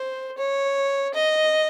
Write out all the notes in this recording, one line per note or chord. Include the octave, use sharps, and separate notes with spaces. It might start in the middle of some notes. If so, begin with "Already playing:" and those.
Already playing: C5
C#5
D#5